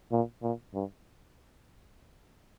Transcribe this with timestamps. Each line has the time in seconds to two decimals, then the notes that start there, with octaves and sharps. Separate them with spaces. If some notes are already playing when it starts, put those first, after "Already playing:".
0.12 A#2
0.43 A#2
0.74 G2